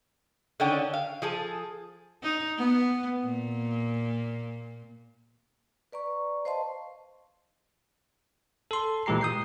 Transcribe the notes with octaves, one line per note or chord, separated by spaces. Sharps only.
D3 D#3 C#4 G5
F5
F3 G#4 A4
D#4
B3
A#2
B4 D5 A#5 C#6
C5 D#5 F5 A5 C6
A4 C6
A#2 E3 G#3 G4 A#5 C7
D#6 G6 C7